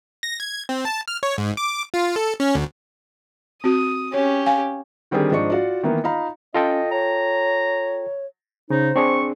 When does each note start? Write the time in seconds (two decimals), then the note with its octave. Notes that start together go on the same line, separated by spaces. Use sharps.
0.23 A#6
0.40 G#6
0.69 C4
0.85 A5
1.08 F6
1.23 C#5
1.38 G#2
1.57 D6
1.94 F4
2.16 A4
2.40 C#4
2.55 D2
3.64 C4 F#4 D#6
4.13 C#4 G4 C#5
4.46 F5 G#5
5.11 D3 D#3 G3 C4 G4 G#4
5.31 G#2 F3 D4 D#5 C#6 C#7
5.50 F4 F#4 D5
5.83 D#3 E3 A#3 B3
6.04 D#4 F4 F5 A#5 B5
6.54 C#4 F4 A4 D#5 G5
6.91 C#5 A#5
8.70 C#3 D#4 C5
8.96 C4 D4 G#4 C#6